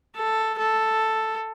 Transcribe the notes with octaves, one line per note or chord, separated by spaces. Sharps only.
A4
A4